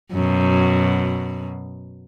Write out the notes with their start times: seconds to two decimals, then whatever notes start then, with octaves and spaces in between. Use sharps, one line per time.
0.12 F#2 B2